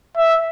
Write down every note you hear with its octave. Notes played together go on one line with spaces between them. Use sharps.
E5